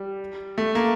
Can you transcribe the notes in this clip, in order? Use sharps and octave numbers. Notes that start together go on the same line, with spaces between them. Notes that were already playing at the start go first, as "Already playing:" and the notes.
Already playing: G3
A3
A#3